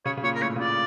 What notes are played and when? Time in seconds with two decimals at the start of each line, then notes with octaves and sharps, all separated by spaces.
0.05 C#3 C#5
0.17 C#3
0.23 A#2 C#5
0.35 A#4
0.42 A2 C#5
0.56 C#3
0.60 A#2 D5